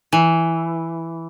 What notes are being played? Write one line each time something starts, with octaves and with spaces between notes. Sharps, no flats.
E3